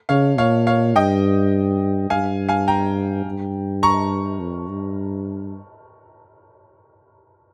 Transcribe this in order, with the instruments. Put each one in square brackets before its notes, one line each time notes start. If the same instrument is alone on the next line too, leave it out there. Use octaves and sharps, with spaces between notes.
[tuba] C#3 [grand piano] C#5 F5
[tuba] A#2 [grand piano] C#5 F5
[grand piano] C#5 F5
[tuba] G2 [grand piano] D#5 G5
[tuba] G2 [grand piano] F5 G#5
[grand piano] F5 G#5
G5 A#5
[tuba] G2
[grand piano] A#5 C#6
[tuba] F2
G2